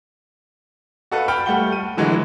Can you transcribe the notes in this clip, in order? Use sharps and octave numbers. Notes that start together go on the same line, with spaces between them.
F#4 A4 B4 F5
G5 A5 B5 F6
G3 A3 F#5 G7
D#7
D3 E3 F#3 G#3